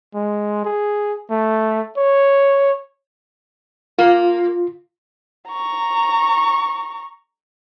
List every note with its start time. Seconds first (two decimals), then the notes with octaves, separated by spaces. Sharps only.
0.14 G#3
0.64 G#4
1.30 A3
1.97 C#5
3.99 A#3 F4
5.48 A#5 C#6